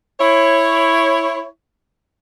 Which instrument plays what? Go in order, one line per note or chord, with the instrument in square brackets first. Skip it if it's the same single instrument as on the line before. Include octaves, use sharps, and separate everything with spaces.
[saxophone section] E4 C#5